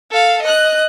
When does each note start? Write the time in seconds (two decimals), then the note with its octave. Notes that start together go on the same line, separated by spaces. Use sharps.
0.11 A4 F5
0.42 D#5 F#6